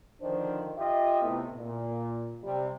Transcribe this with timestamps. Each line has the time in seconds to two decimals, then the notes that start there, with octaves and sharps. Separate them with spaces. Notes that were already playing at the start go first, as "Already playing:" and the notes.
0.22 D3 D#3 F3 D4 C5
0.78 F4 G4 D#5 E5
1.22 A2 C3 A3 B3 E4
1.56 A#2
2.43 C3 G3